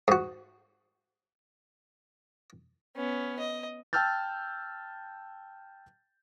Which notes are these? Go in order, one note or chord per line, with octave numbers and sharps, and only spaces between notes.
G#2 F#4
B3 C#4
D#5
G5 A5 E6 F6 G6 A6